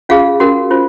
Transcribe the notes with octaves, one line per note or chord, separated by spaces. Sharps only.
C#4 F4 G#4 F5
C#4 F#4 A#4
C#4 F4 C5